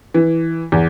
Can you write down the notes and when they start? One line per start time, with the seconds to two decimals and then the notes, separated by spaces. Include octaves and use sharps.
0.14 E3
0.72 E2